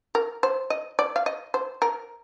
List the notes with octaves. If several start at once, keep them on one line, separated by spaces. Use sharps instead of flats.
A#4
C5
D#5
D5
F5
D#5
C5
A#4